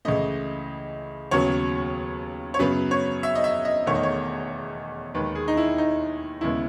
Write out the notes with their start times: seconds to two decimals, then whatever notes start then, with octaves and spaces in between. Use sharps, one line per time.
0.05 C#2 C#3 E3 A3 D#5
1.31 D#2 C#3 F#3 B3 C#5
2.54 C#5
2.59 F#2 C#3 F#3 B3 B4
2.91 C#5
3.23 E5
3.35 D#5
3.44 E5
3.65 D#5
3.86 E1 E2 D#3 A3 C#5
3.95 D#5
4.03 C#5
5.14 D#2 D#3 G#3 B4
5.35 G#4
5.48 D#4
5.57 E4
5.78 D#4
6.41 E1 D#2 C#3 G#3 B3 E4